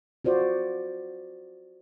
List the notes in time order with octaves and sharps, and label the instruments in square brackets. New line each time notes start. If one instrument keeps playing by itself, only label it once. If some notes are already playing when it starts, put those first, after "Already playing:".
[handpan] F4 F#4 C5 D5